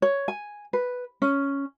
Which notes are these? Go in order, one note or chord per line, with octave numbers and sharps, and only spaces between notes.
C#5
G#5
B4
C#4